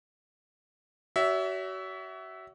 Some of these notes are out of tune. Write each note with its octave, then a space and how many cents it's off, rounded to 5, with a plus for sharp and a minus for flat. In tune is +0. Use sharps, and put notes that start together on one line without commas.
F#4 +30 C#5 +40 E5 -5